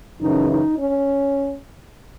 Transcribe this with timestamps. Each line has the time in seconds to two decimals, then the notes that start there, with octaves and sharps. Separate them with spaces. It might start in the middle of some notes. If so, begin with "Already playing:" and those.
0.21 F#2 C#3 E3 D#4
0.51 D#4
0.79 C#4